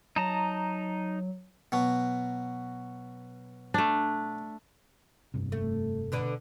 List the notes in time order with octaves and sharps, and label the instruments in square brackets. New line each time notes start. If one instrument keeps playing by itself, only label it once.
[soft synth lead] F#3 [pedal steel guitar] D#4 A5 A#5
[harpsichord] B2 F#3
[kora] A3 D4
[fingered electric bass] F1 G2 C3
[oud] A3
B2 D3 B4